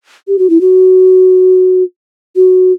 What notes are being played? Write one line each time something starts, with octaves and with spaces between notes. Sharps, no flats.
G4
F#4
E4
F#4
F#4